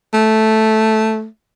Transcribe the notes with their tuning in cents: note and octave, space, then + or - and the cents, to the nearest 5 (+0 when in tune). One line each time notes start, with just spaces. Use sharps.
A3 -5